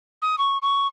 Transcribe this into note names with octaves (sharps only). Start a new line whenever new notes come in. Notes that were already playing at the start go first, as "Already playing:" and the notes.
D#6
C#6
C#6